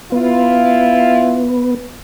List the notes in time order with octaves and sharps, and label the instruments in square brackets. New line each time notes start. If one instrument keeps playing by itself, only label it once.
[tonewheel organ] B3 [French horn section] E4 F4